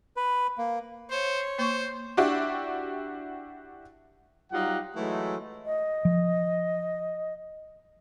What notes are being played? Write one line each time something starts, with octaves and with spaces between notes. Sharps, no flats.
B4
A#3
C5 C#5
A#3 C5 C#6
D4 E4 F#4 G4
F#3 G3 D#4 F4 G4 F#5
E3 F#3 G#3 A3
D#5
F3